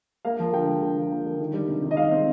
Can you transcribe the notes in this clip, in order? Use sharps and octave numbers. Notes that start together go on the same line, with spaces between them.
A#3 F5
F3
D3 G5
A#3
D3
F3
A#3
D3
D#3
G3
C3
D#3
D#5
C3 F5
C4